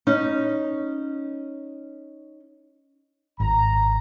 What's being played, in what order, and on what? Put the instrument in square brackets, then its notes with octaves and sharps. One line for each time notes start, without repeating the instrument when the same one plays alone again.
[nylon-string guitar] C#4 D#4
[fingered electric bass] G#1 [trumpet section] A#5